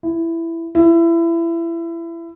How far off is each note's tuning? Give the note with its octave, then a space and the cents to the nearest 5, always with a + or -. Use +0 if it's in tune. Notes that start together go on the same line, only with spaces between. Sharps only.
E4 +10
E4 +25